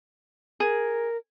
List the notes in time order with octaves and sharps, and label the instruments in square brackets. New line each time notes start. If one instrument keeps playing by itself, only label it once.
[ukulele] G#4 [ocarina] A#4